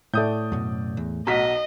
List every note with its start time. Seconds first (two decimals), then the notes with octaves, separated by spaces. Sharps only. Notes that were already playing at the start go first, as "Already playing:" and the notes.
0.14 A2 A3 D5 D#6 G6
0.52 F#2 B2
0.97 E2
1.27 B1 F#4 D#5 A#5 B6